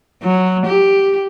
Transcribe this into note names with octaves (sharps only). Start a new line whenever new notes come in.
F#3
G4